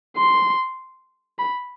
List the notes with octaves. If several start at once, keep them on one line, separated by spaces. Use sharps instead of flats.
C6
B5